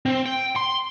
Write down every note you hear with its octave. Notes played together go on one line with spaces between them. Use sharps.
C4
G5
C6